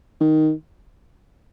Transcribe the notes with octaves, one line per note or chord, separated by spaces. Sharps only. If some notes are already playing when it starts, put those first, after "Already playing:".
D#3